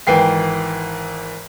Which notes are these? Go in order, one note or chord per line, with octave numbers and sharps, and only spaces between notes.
G#1 E3 G5 C7